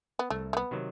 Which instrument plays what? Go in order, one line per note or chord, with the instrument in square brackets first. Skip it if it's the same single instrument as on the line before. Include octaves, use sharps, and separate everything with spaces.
[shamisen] B3
[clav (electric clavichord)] C2 [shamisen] A3
[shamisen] A3
B3
[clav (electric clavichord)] C3 D#3 F#3